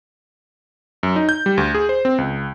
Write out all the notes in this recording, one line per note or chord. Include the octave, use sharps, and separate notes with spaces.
F#2
D#4
G6
G3
D2
G#4
C5
C4
C#2